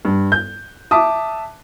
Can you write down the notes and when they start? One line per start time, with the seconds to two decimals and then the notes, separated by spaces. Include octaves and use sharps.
0.05 G2
0.32 G6
0.91 E5 A5 D6 D#6